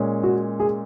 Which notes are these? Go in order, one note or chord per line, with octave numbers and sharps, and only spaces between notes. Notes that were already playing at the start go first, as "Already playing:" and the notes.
Already playing: A#2 G#3 C#4
F#4
G#4